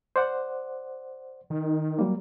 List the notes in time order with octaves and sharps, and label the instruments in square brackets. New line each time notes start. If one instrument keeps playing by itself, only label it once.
[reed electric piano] C5 D5 F#5
[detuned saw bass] D#3
[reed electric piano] F#3 G3 A#3